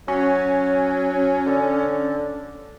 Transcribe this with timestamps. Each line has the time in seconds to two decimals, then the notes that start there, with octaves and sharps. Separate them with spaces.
0.08 F#3 C#4
1.47 D3